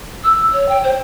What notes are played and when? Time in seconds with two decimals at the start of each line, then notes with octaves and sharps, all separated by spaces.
0.24 E6
0.53 C#5
0.69 G5
0.84 C5